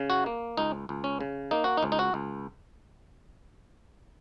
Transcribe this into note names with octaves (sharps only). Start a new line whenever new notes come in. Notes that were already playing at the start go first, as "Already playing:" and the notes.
Already playing: C#3
F#4
A#3
C#2 D#4
C#2
C#4
C#3
A#3 D#4
F#4
D#4
C#2
D#4
F#4
C#2